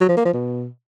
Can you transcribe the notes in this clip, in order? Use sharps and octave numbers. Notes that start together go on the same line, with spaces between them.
F#3
F3
A#3
F3
B2